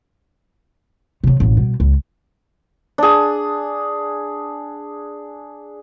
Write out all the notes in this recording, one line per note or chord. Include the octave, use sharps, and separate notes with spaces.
C3 F#3
A1 B2
B2 G3
C#2
D4 G#4